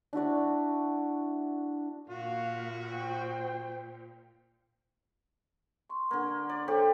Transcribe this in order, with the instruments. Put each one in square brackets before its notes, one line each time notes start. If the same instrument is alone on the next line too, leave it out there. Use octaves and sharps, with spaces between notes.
[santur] D4 E4 F#4 D5
[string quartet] A#2 [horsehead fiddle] A#3 F5 [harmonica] F#4
[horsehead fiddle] C5 G5
[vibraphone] C6 C#6
[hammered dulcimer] D3 A#3
D5
[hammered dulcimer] G4 C5 C#5 [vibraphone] A4